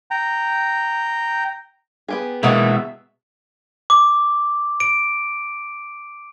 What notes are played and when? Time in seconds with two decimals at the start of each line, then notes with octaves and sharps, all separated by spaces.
0.11 G5 A#5
2.08 B3 G4 G#4
2.43 B2 G#3 A#3 D#4 F#4 E5
3.90 D6
4.80 D7